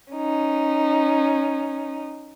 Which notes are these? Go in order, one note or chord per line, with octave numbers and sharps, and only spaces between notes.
C#4 D#4